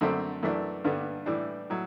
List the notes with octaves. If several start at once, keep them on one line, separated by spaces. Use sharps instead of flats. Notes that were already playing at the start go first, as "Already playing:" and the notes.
F#2 D3 A3 C4
F#2 E3 A3 D4
G2 D3 G3 B3
A2 E3 G3 D4
A2 F#3